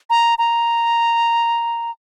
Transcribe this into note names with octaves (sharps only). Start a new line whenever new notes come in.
A#5
A#5